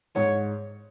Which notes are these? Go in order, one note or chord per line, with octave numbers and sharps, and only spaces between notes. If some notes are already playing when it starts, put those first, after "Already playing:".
G#2 C#5